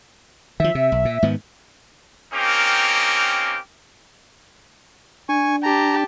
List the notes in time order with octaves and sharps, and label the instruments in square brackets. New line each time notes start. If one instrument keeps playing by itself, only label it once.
[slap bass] D#3 F3 [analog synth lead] E5
[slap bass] C3
B1
A#2
G#2 D#3 B3
[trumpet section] A#3 C4 C#4 D#4 G4 A#4
[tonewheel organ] D4 [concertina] G#5 C#6
[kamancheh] G4 A5 [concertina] A#5